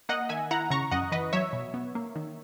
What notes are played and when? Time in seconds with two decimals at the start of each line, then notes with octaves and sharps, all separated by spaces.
0.09 A#3 D#5 F#5
0.29 D#3 E5 G#5
0.51 E4 F#5 A#5
0.70 C#3 A#5 C#6
0.91 F#2 D#5 F#5
1.12 E3 B4 D#5
1.33 F#3 C#5 E5
1.53 B2
1.74 B3
1.95 A#3
2.15 D#3